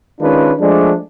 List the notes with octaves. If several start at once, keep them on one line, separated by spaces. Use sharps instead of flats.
D#3 G#3 C#4 D4 F4 B4
F3 G#3 A3 D4